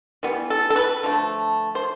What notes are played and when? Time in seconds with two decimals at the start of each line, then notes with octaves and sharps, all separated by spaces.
0.23 E3 G3 B3
0.50 A4
0.70 A4
0.76 B4
1.03 D3 F3 A3
1.75 C5